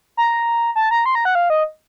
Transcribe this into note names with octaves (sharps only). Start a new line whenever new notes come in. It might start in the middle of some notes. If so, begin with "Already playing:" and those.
A#5
A5
A#5
C6
A#5
F#5
F5
D#5